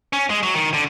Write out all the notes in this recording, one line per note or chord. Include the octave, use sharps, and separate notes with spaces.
C#4
G#3
F#3
D#3
D3